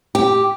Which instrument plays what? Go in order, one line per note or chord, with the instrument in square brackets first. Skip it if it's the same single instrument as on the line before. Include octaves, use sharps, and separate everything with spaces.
[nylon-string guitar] G4